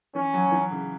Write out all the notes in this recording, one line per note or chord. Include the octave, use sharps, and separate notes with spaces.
E3 C#4
F#3
E3
C#3